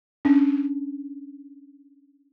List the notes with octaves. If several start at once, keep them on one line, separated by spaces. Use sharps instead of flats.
C#4 D4